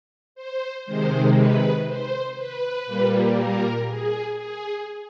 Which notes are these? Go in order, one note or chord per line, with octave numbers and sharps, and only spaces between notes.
C5
C3 D#3 G#3 C5
B4
C5
B4
A#2 G3 A#3
A#4
G#4
G#4